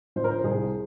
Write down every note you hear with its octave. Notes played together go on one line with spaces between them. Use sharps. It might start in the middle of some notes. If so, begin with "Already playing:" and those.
D3 F3 A#4 C5
C5
C2 G#4